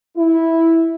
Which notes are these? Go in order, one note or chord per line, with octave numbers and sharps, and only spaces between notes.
E4